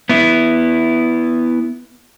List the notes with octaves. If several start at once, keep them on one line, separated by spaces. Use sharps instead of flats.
B3 E4